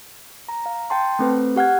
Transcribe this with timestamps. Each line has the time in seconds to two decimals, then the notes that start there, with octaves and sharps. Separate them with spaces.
0.49 A#5
0.66 F5
0.90 G5 A5 C6
1.19 A3 C4 B4
1.56 G4 F#5 F6 G#6